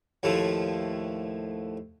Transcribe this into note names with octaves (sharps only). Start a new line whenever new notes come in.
D#2 A2 F3 A3